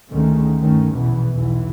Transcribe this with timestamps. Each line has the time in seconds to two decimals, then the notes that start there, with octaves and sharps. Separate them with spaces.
0.10 D2 D3 D#3 G#3 A3 C#4
0.59 G2 D#3 A3 C#4
0.92 A#1 E2 B2 E3
1.34 B1 E2 B2 E3